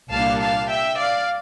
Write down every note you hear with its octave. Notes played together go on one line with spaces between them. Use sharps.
C2 A#2 G3 A#3 D4 F5 A5
F5 A5
E5 G5
D5 F5